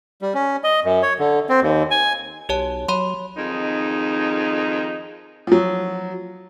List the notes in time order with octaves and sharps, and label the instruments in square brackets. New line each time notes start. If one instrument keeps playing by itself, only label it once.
[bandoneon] G3
C#4
D#5
F#2
C#5
D3
C4
D#2
G#5
[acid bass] B1 [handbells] G4 C#5 A5
[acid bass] F#3 [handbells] C#5 B5 C6
[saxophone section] F2 D#3 D#4 G#4
[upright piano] F3 F#3